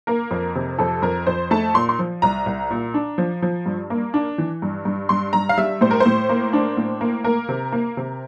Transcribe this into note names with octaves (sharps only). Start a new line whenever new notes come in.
A#3 A#4
F2
C3
F2 A4
F2 A#4
F2 C5
A3 A5
A#2 C6
C6
F3
C2 A#5
C2
A#2
D4
F3
F3
G2
A#3
D4
E3
G2
G2
G2 C6
G2 A#5
F5
G3 E5
A2 C5
A#4
C5
A2
A#3
D4
A2
A#3
A#3 A#4
C3
A#3
C3